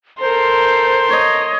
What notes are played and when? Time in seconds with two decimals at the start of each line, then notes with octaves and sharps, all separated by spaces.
0.20 A4 A#4 C5 C6
1.09 C#5 D#5